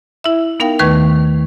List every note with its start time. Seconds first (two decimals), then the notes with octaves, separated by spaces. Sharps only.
0.24 E4 E5
0.60 B3 D#4 A#4 F5 G5
0.79 D#2 D#3 A3 B4 C#6 G#6